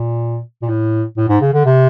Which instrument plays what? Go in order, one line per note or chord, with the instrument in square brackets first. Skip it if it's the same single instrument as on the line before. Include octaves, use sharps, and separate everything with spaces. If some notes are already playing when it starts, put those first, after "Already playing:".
Already playing: [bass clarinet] A#2
A#2
A2
A2
G#2
C#3
D3
C3